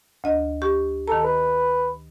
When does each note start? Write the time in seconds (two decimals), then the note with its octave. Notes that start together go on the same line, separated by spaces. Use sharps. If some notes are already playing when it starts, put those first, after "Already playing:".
0.24 D2 D#5
0.62 G4 C#6
1.08 D#3 A4 A#5
1.24 B4